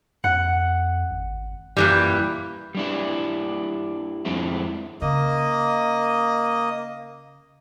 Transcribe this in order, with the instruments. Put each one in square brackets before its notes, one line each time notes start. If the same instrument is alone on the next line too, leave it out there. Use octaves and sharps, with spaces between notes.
[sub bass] F2 [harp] F#5
[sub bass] G#1
[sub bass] F#2 [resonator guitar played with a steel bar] A#2 E3 G3
[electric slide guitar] G3 D4 E4
F2 G#3 C4 E4
[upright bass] C#3 [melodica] A#3 D#5